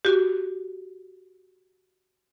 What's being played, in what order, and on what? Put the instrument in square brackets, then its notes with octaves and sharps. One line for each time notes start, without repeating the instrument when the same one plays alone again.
[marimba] F#4 G4